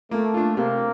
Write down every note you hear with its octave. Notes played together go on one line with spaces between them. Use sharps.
A3 A#3
D4 F4
C3 A#3